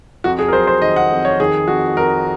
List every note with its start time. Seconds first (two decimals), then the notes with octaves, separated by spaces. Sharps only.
0.24 F2 F#4
0.39 G#4
0.48 A#4
0.53 F#3 C5
0.67 C5
0.82 D#3 D#5
0.96 F#5
1.11 F2
1.25 C#5
1.40 D#3 G#4
1.68 F2 F#4
1.96 F2 A#4